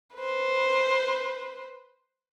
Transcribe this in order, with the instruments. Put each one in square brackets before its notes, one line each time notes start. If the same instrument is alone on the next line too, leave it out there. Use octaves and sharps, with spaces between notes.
[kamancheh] B4 C5